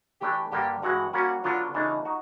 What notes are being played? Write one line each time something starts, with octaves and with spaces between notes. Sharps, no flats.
E3 A3 D4 G4
G2 D3 G3 A#3 G4
G2 E3 G#3 F#4
G3 A#3 C#4 F#4
D3 F#3 B3 D4 F4
C#3 E3 A3 D4 D#4
D#4 F#4